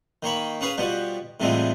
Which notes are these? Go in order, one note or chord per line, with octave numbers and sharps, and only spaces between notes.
D#3 A#3 C#5 B5
C#4 G#4 B4 F5
B2 F3 G3 F#4
A2 C3 E3 F3 G3 G#3